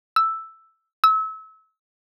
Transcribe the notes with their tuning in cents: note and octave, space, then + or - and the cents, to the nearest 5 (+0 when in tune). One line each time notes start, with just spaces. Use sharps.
E6 +0
E6 -30